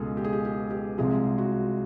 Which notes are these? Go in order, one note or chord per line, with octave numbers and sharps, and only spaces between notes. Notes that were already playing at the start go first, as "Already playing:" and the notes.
Already playing: C#2 B2 G#3 G#4 A4
G4
G#4
G4
G4
G4
C2 C3 F3 G#3 G#4
F#4